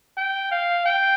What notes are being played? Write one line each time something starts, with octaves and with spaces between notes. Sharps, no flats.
G5
F5
G5